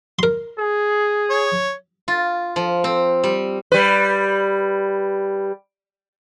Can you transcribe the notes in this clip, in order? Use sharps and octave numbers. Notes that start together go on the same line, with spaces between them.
A#4 C6
G#4
C#5
F4
F3
C4
G3
G3 B4